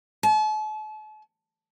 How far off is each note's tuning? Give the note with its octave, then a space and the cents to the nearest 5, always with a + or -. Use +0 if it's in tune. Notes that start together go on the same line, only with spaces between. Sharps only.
A5 -40